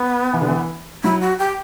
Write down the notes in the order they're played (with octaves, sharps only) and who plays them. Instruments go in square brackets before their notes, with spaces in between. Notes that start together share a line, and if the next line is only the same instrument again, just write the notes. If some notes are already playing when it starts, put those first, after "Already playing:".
Already playing: [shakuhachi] B3
[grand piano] E3
D3
E3
[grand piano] F#3 [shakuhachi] E4
[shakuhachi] F#4
G4